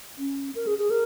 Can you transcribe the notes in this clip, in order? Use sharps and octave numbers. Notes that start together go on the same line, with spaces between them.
C#4
A#4
G#4
G#4
A#4